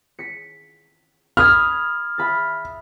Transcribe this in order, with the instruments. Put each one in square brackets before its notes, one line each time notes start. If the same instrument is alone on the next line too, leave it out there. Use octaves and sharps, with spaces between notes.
[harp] B6 C#7
[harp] B5 D#6 G#6 [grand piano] F6
[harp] E5 B5 A6